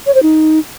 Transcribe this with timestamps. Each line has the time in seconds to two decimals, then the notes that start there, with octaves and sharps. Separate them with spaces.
0.06 C#5
0.15 C5
0.23 D#4